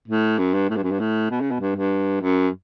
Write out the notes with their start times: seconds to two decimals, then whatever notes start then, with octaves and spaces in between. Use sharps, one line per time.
0.08 A2
0.39 F#2
0.54 G2
0.69 A2
0.76 G2
0.83 F#2
0.91 G2
1.00 A2
1.30 B2
1.41 C#3
1.51 B2
1.60 G2
1.76 G2
2.21 F#2